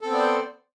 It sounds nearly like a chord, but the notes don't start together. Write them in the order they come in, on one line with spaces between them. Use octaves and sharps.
A4 C4 B3 D5 C5